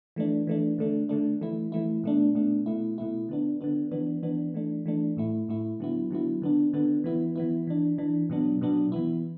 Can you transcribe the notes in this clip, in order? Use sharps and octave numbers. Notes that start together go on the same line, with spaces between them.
E3 A3 D4
E3 A3 D4
D3 A3 D4
D3 A3 D4
E3 A3 E4
E3 A3 E4
B2 A3 D4
B2 A3 D4
B2 A3 E4
B2 A3 E4
D3 B3 D4
D3 B3 D4
E3 B3 D4
E3 B3 D4
E3 A3 D4
E3 A3 D4
A2 A3 E4
A2 A3 E4
D3 F#3 B3 E4
D3 F#3 B3 E4
D3 B3 D4
D3 B3 D4
E3 B3 E4
E3 B3 E4
E3 D4
E3 D4
B2 F#3 B3 D4
B2 F#3 B3 D4
E3 B3 E4